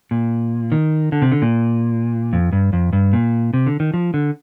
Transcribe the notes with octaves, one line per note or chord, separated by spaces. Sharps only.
A#2
D#3
D3
C3
D3
A#2
F2
G2
F2
G2
A#2
C3
D3
D#3
F3
D3